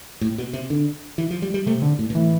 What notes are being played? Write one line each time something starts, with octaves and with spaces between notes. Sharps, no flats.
A2
B2
C3
D3
E3
F3
G3
G3
C3 A3
D3
A2
B2
A2 E3